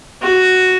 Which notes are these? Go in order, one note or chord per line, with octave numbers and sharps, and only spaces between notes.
F#4